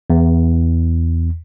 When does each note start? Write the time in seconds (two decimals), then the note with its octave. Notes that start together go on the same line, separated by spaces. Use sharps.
0.10 E2